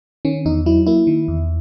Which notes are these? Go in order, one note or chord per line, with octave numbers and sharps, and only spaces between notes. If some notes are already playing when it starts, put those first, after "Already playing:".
D#3 C#4
E2 D#4
F#3 E4
A#3 E4
D#3
E2